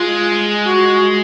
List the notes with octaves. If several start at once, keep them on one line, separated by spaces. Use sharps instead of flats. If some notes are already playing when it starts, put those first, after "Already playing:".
Already playing: G#3 F4
F#4